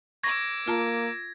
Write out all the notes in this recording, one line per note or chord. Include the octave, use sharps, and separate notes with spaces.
C#6 D6 E6 G#6 A#6
A#3 F4 A5 A#5